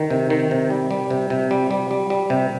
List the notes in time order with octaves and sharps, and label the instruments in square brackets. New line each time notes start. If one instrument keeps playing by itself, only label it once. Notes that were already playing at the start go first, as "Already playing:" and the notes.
Already playing: [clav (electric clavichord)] D#3
C3
D#3
C3
G3
G3
C3
C3
G3
G3
G3
G3
C3